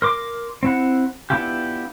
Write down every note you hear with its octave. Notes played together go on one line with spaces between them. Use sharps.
A#4 C6 D6
C4 E4 F#5
B3 D4 E4 F4 G4